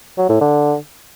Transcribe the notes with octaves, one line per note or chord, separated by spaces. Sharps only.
F#3
A2
D3